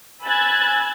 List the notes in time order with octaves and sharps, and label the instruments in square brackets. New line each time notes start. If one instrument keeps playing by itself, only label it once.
[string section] G#5 B5 E6 F#6 G#6 A6